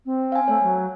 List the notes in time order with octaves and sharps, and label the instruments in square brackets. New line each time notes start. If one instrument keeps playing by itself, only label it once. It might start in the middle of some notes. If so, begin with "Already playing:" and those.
[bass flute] C4
[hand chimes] F5 G#5
[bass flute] A3 [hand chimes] C#5
[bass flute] F#3